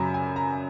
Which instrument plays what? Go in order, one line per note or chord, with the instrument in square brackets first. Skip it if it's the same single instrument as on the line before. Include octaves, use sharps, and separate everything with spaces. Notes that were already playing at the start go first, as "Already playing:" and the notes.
Already playing: [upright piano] F#2 C#3 F#3 A#5 B5
G#5
A#5